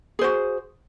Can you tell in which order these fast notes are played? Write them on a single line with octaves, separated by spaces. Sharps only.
G#4 C5 F#4